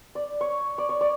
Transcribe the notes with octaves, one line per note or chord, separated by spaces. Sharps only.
D5
C#5
D5
C#5
D5